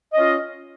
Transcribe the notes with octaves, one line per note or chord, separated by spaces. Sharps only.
C#4 F4 D#5